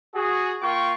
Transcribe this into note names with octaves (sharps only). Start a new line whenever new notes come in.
F#4 G#4
A#3 F4 G5 C#6